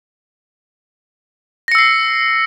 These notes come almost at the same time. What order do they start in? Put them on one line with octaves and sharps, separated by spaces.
A#6 C#7 E6 C7